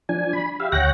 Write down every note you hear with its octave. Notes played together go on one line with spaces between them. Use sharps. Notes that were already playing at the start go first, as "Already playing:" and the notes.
F3 D4 G#5
B5
G4 E5 F5
D2 C#5 F#5 G5 F#6 A#6